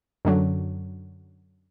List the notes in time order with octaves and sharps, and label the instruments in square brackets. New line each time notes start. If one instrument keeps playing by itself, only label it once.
[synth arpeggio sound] F#2 D3 F#3